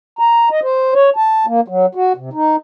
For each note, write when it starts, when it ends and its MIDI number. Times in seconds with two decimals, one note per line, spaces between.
0.19 0.49 82
0.51 0.60 75
0.63 0.94 72
0.94 1.10 73
1.16 1.46 81
1.46 1.61 58
1.68 1.86 54
1.95 2.13 66
2.16 2.30 48
2.33 2.56 63